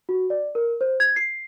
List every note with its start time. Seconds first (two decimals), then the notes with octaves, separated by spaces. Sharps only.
0.09 F#4
0.30 D5
0.55 A#4
0.81 C5
1.00 G#6
1.16 C7